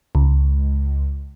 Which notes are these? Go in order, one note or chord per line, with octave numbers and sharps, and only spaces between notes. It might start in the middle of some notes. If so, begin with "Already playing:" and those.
C#2